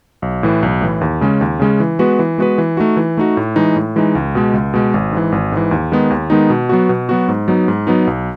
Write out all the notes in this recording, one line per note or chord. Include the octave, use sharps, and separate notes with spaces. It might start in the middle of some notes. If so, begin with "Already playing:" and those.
B1
A2 E3
B1
A2 E3
D#2
C#3 G#3 C#4
D#2
C#3 G#3 C#4
E3
G#3 B3 F#4 B4
E3
G#3 B3 F#4 B4
E3
A3 D#4 F#4
E3
A3 D#4 F#4
A2
E3 G#3 D#4
A2
E3 G#3 D#4
C#2
B2 G#3
C#2
B2 G#3
G#1
G#2 E3
G#1
G#2 E3
D#2
D#3 G#3 B3 D#4
D#2
D#3 G#3 B3 D#4
B2
F#3 B3 F#4
B2
F#3 B3 F#4
G#2
F#3 B3 D#4
G#2
F#3 B3 D#4
B1